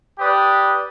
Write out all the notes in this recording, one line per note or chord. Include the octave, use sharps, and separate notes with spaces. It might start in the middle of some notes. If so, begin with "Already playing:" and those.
G4 B4 D5 D#6